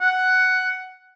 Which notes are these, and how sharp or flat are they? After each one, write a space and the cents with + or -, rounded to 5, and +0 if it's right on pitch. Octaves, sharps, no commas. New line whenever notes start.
F#5 +5